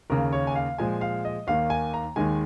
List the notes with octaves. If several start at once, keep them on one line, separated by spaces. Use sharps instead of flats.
D#2 C#3 A#3 A#4
C#5
G#5
F5
A#2 F3 G#3 G#5
F5
D#5
D#2 D#3 A#3 F5
G#5
A#5
D#2 D#3 G#3 G#5